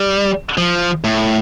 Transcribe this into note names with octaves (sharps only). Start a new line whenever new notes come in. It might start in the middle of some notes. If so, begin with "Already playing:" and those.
Already playing: G3
F3
A2